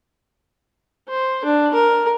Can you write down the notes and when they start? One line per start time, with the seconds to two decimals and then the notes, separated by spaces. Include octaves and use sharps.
1.09 C5
1.45 D4
1.74 A#4